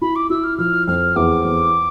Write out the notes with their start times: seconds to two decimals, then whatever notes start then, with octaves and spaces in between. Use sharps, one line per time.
0.01 E4 B5
0.16 D6
0.30 E4 E6
0.44 F6
0.58 F3 F6
0.87 F2 F6
1.16 E2 D6
1.44 E2